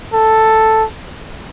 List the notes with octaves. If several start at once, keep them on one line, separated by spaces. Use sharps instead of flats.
A4